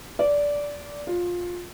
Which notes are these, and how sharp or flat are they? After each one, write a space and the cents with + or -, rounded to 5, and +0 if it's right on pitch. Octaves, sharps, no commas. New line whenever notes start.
D5 -15
F4 +15